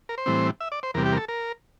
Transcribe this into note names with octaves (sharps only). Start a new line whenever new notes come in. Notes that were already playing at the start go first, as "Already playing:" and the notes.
A#4
C5
A2 E3 G3 C4
E5
D5
C5
E2 C3 G3 A#4
G4
A#4
A4
A#4